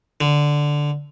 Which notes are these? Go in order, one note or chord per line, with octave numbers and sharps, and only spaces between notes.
D3